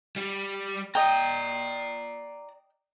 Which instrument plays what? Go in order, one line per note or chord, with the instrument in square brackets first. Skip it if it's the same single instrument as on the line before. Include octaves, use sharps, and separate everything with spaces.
[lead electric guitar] G3 G4
[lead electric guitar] D5 A#5 [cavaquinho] D#5 G5